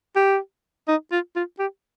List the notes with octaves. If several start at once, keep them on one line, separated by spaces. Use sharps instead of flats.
G4
D#4
F4
F4
G4